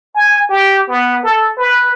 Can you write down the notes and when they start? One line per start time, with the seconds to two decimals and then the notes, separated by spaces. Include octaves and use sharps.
0.15 G#5
0.49 G4
0.88 B3
1.23 A4
1.57 B4